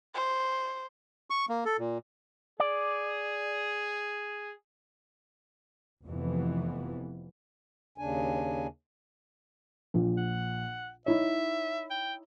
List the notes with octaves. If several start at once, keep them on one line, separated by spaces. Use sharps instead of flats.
C5
C#6
A#3
A4
A#2
G#4 D5
F1 F2 C3 E3 B3
D#2 C#3 D4 G#5
A#1 A#2
F#5
D#4 E4 C#5 E5
G5